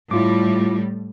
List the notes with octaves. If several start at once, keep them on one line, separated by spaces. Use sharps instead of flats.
A2 G3 E4 F4 D6